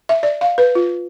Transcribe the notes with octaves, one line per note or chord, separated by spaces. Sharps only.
E5
D5
F5
B4
F4